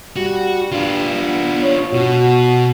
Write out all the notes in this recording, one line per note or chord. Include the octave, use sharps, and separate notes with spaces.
G3 F#4
G2 D4 F4
B3
C#5
B2 F#4